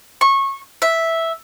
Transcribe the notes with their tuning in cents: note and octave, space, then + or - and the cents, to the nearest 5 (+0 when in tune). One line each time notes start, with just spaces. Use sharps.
C#6 -20
E5 -5